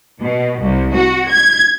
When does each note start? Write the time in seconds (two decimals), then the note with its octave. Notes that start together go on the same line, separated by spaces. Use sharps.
0.22 B2
0.63 C2
0.95 F#4
1.30 G#6